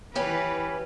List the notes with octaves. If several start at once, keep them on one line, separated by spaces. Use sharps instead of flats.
E3 C#4 G4 B4